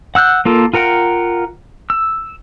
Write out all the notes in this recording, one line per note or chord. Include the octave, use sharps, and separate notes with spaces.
F#5 E6 F#6 G6
A#3 F4 A4 A#4
F4 A#4 F#5 G5
E6